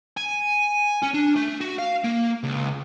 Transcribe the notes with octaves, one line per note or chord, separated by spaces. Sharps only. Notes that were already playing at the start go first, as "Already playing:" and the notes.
G#5
C#4
D4
A3
F#4
F5
A#3
C#2